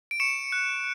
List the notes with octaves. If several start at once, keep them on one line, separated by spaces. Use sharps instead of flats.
D7
C#6 C#7 E7
F#6